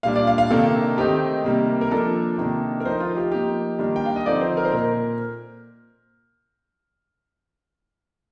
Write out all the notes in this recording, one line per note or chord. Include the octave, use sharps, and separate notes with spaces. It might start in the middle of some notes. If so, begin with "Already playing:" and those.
A#2 G3 D4 F5
D5
F5
F5
C3 D#3 A#3 D4 A4
D#3 A3 C4 D#4 G4
C3 D#3 G3 A#3
A#4
F3 A#3 D4 A4
C3 D#3 A#3 D4
A#4
F3 A3 D#4 C5
F4
G4
F3 A#3 D#4 G4
D#3 G3 A#3 D4
G5
F5
D#5
D3 F3 C4 D#4 D5
C5
A#4
C5
A#2 A#4